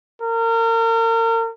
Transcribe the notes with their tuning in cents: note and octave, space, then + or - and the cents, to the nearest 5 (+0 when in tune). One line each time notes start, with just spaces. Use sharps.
A#4 -35